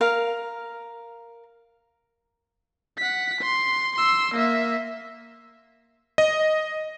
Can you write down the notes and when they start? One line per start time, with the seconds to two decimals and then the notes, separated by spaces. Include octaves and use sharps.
0.01 A#4 F5
2.98 F#5 B6
3.41 C6
3.96 C6 E6
4.34 A#3 E5
6.18 D#5